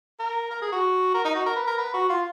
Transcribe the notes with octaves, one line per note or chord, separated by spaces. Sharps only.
A#4
A#4
G#4
F#4
A#4
D#4
F#4
A#4
B4
A#4
B4
F#4
F4